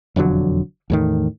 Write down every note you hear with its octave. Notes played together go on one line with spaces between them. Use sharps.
E1 F2 D3 F#3
E2 A2 D#3